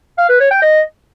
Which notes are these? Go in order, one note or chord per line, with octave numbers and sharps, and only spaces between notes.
F5
B4
C#5
G5
D#5